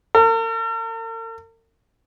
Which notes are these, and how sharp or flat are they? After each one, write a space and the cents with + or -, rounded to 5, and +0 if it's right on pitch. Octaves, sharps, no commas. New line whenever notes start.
A#4 -45